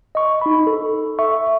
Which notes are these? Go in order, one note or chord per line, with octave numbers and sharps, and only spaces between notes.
D#5 C#6
D#4 B5
A4
E5 C#6